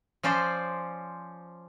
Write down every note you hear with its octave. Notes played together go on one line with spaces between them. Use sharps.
F3 C#4 C5 D5